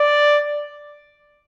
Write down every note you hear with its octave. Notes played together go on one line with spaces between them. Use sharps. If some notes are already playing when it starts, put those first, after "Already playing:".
Already playing: D5